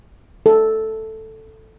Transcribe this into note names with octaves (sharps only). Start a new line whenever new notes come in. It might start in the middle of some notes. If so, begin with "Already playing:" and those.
A4